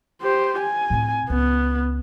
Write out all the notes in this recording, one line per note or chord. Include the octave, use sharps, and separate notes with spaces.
G4 C5
G#5
A2 C4
C#2 B3